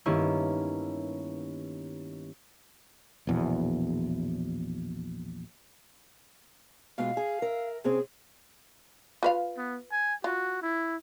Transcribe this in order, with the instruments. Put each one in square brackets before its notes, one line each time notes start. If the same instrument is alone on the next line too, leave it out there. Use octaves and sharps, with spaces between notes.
[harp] G2 D#3 A#3 B3 C#4 E4
[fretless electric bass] A#1 E2 B2
[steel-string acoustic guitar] B2 G#3 F4 [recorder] F5
[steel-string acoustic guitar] G#4
A#4 E5
[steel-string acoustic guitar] C3 C4 C#4 [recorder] G#4
[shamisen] F4 B4 F5
[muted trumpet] B3
G#5
[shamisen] F4 [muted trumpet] F#4
[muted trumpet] E4